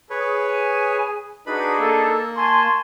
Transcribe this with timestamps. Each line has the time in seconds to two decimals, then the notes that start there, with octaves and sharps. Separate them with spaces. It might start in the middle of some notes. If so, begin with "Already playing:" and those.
0.10 G#4 B4 C#5
0.47 G#5
1.47 D4 D#4 F#4 G#4 B4 B5
1.79 A#3 A4
2.37 G#5 A5 C6 C#6